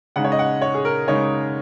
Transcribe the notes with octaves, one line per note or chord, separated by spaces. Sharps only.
C#3 G#3 D#4 F#5
C#5
D#5
F#5
C#5
G#4
A#4
C#3 G#3 D#4 C#5